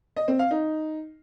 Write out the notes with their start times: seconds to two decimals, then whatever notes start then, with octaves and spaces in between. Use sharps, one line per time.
0.16 D#5
0.28 C4
0.39 F5
0.51 D#4